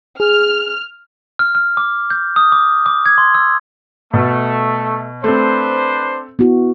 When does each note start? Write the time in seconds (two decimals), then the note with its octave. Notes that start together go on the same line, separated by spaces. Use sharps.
0.20 G#4 F6
1.39 F6
1.55 F6
1.77 D6
2.10 G6
2.36 D#6
2.52 D6
2.86 D6
3.06 G#6
3.18 C6
3.34 E6
4.14 B2 A3
5.24 A3 C4 D4 B4 C5
6.39 B3 E4 F#4